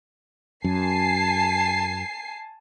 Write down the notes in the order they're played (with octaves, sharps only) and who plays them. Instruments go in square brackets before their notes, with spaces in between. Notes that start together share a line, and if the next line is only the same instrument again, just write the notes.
[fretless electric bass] F#2 [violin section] G#5 A5 C7